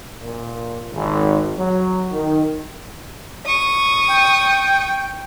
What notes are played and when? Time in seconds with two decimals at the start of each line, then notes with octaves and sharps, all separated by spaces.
0.21 A#2
0.93 G#1
1.57 F#3
2.11 D#3
3.46 C#6 D#6
4.08 G5